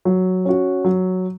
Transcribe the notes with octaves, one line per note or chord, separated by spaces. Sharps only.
F#3
C#4 F#4
F#3